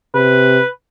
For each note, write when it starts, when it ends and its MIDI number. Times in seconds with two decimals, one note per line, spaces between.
0.15 0.59 48
0.15 0.68 71